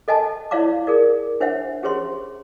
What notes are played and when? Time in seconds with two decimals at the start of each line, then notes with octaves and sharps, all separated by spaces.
0.08 A4 D#5 G#5 A5
0.51 E4 C#5 D5 F5 A#5 D6
0.87 G#4 A#4 D5
1.41 D4 C5 C#5 E5 F#5
1.83 C#4 G4 G#4 C5 C#5 C6